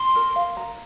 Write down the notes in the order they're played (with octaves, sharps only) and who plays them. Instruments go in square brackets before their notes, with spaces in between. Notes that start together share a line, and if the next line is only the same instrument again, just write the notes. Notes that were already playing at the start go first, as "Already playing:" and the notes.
Already playing: [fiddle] C6
[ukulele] A#4
F5
A#5